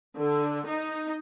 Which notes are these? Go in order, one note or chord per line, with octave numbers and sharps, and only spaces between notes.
D3
D#4